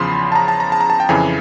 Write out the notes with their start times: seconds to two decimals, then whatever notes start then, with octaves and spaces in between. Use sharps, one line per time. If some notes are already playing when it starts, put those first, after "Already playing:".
Already playing: E2 C#3 F3 B5 C6
0.32 A5
0.35 A#5
0.48 A5
0.60 A#5
0.72 A5
0.81 A#5
0.90 A5
1.00 G5
1.09 F2 C#3 E3 G#5